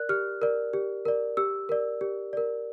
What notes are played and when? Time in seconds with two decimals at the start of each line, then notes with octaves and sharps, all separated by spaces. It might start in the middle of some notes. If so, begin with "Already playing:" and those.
Already playing: A#4 D5 F#6
0.09 G4 F6
0.42 A#4 D5
0.73 G4
1.05 A#4 D5
1.37 G4 E6
1.69 A#4 D5
2.01 G4
2.33 A#4 D5